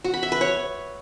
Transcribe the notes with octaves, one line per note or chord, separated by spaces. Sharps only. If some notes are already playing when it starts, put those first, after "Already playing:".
F#4
B5
E5
B4
C#5